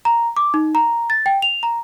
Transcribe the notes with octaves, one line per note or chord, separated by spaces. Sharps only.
A#5
D6
D#4
A#5
A6
G5
F7
A#5